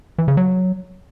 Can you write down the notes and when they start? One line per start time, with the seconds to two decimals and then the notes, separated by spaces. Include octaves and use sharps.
0.18 E3
0.28 C#3
0.37 F#3